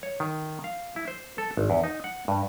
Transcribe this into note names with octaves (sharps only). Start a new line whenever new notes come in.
C#5
D#3
F5
E4
C5
A4
G#1
E2
D#4
F#5
G2